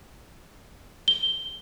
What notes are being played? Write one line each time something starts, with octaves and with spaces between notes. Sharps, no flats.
G7